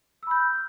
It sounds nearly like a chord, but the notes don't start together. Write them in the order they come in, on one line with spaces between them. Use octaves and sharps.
E6 B5 G6 F6